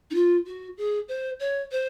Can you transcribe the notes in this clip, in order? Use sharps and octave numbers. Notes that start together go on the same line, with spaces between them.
D#4
F4
F#4
G#4
C5
C#5
C5